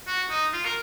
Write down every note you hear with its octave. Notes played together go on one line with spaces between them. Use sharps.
F#4
D#4
F4
A#4